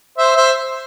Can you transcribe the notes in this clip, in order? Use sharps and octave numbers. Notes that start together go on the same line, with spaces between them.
C5 E5
C5 E5